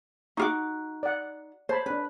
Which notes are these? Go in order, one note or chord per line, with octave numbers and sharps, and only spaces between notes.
D#4 F4 F#4 C#6 D6
D5 F#5
C5 C#5 A5 B5
C#4 D4 B4